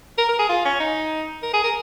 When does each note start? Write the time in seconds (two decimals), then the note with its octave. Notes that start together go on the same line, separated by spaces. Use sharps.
0.18 A#4
0.29 A#4
0.39 G#4
0.49 F4
0.65 C#4
0.80 D#4
1.43 A#4
1.54 G#4
1.64 A#4